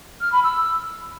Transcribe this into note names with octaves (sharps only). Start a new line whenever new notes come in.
F6
B5
E6